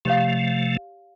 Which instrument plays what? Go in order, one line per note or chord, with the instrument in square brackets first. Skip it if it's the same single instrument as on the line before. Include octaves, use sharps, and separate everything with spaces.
[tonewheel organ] C3 F3 A3 [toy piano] G4 C#5 F5